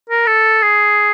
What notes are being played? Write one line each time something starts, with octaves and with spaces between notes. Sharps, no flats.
A#4
A4
G#4